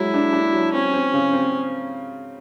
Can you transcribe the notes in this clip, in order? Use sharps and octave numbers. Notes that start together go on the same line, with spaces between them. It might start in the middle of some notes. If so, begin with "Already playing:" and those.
Already playing: F#3 G#3 E4
D4
D4
F#3
C4 C#4
C4
C#3
C4